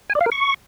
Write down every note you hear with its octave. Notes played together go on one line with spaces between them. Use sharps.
G#5
D5
F5
A#4
C#6